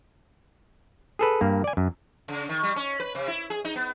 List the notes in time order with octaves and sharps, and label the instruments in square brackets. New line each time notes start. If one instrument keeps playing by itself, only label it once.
[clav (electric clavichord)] G#4 A4 B4
G2 A#3
D5 G#5
F#2
[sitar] C#3
D#3
G3
C#4
B4
C3
E4
G#4
D#4
B3